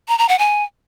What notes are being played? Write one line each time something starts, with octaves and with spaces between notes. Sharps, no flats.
A#5
A#5
F#5
G#5